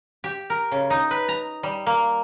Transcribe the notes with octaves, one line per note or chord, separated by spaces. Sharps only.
G4
A#4
C#3
D#4
B4
A#5
G3
A#3